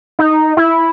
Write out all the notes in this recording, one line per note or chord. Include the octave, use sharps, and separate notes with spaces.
D#4
E4